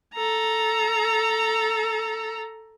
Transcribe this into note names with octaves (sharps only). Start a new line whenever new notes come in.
A4 A#5